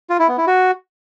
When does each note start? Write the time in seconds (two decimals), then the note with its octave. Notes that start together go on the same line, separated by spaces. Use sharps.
0.10 F4
0.19 E4
0.28 B3
0.38 E4
0.47 F#4